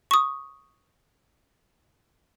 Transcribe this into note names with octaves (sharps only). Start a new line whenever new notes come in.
C#6 D#6